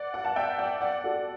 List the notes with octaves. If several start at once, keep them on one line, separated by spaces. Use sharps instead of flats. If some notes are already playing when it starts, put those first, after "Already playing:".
Already playing: D5 F#5
D5 F#5
F#5 A5
E5 G5
D5 F#5
D5 F#5
F#4 A4